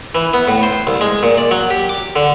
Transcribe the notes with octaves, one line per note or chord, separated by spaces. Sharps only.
E3
B3
A2
C5
C2
G#3
A#2
D5
F#3
G4
D6
D3